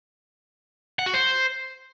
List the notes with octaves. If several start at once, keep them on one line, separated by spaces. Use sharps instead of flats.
F#5
F#4
C5